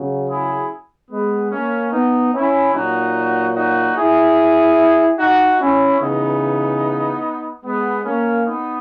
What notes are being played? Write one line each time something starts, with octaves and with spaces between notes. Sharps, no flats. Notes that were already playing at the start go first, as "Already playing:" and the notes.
Already playing: C#3 F#3
E4 G#4
G#3 B3
A#3 C#4
B3 D#4
C#4 E4
A#2 F#3 D#4 F#4
D#4 F#4
E4 G#4
D#4 F#4
C#4 E4
C#3 E3 B3 D#4
G#3 B3
A#3 C#4
B3 D#4